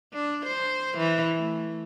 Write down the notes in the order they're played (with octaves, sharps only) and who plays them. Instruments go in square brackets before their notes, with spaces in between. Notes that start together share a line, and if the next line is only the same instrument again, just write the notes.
[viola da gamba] D4
C5
E3
A3